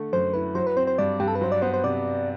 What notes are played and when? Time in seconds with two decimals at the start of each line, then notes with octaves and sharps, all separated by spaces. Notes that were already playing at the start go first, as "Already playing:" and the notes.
Already playing: D3 A3
0.13 F#2 C5
0.34 E4 B4
0.55 F#3 C5
0.67 B4
0.77 C4 C5
0.87 C5
0.98 G2 D5
1.20 G2 G4
1.28 A4
1.35 B4
1.41 F#3 C5
1.52 D5
1.62 B3 C5
1.74 C5
1.84 C3 D5